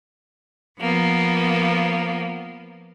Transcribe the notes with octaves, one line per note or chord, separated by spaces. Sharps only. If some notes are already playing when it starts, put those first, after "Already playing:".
F3 A#3 B3